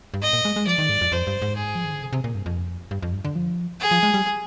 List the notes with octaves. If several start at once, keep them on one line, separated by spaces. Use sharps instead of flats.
G2
G#2 D#5
A#2
G#3
G#3
F3 D5
D#3
G#2
F2
F2 C5
G2
G#2
G#4
F3
D#3
D3
C3
C3
A#2
G2
F2
G2
F2
G2
D3
F3
G#4
F3
G#3
G3